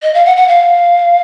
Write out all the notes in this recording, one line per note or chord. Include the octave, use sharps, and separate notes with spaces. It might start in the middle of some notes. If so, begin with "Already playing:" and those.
D#5
F5
F#5
F#5
F5